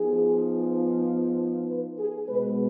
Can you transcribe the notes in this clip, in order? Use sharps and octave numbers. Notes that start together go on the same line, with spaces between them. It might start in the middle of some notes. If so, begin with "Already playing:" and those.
Already playing: F3 B3 D#4 G#4
B4
G#4
B2 G#3 B3 B4